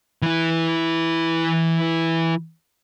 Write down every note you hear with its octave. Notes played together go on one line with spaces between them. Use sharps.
E3 E4